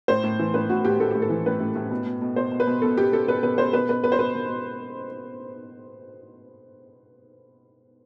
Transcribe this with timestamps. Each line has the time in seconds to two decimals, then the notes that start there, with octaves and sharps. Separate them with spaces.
0.08 A2 C5
0.23 A2
0.39 E3
0.54 A2 B4
0.69 A2 F#4
0.85 A2 G4
0.99 A2 A4
1.11 A2 G4
1.22 A4
1.30 E3
1.46 A2 B4
1.60 A2
1.75 A2
1.91 B2
2.06 B2
2.22 B2
2.36 B2 C5
2.52 B2
2.60 B4
2.67 B2
2.82 B2 A4
2.97 B2 G4
3.12 B2 A4
3.27 B2 B4
3.43 B2 B4
3.58 B2 C5
3.73 B2 B4
3.89 B2 B4
4.03 B2 B4
4.12 C5
4.19 B2 B4
4.34 B2
4.49 B2